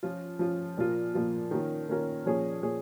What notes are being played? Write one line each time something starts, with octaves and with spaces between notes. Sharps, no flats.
F3 C#4 F4
F3 C#4 F4
A#2 F3 A#3 F4
A#2 F3 A#3 F4
D#3 A#3 C#4 F4 A#4
D#3 A#3 C#4 F4 A#4
A#2 F3 C#4 G#4 C#5
A#2 F3 C#4 G#4 C#5